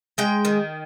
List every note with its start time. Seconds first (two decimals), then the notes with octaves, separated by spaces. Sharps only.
0.18 G#3 G5
0.45 D#3